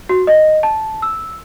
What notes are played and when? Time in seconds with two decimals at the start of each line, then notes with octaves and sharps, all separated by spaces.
0.09 F#4
0.27 D#5
0.63 A5
1.02 E6